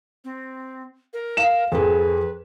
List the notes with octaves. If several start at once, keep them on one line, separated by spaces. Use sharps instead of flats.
C4
A#4
F5 E7
F2 G#4 B4